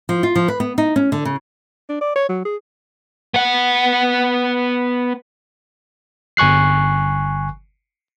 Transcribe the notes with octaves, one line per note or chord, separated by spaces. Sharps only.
F3
F4
F3
B4
B3
D#4
C#4
D3
C#3
D4
D5
C#5
F#3
G#4
B3 F#5
G1 G#5 C#6 F#6 C7